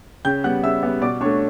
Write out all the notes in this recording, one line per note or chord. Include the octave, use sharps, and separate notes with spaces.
C#3 G5 G6
G3 B3 F#5 F#6
C#3 E5 E6
G3 B3
B2 D5 D6
A3 D4 C#5 C#6